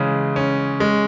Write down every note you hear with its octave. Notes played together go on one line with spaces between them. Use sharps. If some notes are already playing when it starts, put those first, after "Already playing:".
Already playing: C#3 E3 G#3
C#4
G#3